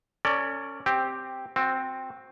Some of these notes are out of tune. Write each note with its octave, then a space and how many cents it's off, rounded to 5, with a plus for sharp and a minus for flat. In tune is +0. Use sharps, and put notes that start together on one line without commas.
C#4 +0 A4 +40 D5 +0
C4 +0 G4 +0
C4 +0 F#4 -25